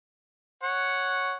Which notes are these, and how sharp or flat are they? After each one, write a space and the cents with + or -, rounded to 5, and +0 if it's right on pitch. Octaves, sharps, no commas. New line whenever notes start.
C#5 +0 F#5 +0